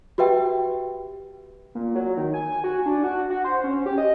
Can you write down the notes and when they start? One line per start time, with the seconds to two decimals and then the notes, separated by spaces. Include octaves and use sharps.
0.18 F#4 G4 B4 E5 G5
1.75 A#2
1.95 F#3
2.17 D#3
2.34 G#5
2.64 F#4
2.86 D4
3.04 F#4
3.30 F#4
3.45 C5
3.64 C#4
3.86 G4
3.98 D#5